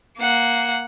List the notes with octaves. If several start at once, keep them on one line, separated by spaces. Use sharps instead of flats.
A#3 F#5